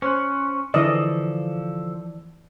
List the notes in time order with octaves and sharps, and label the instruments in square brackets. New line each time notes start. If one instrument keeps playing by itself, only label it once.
[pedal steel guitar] C#4 [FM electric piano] C5 C6 F#6
[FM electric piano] D3 [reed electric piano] E3 D5 [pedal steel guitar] F3 A4 [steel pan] D#5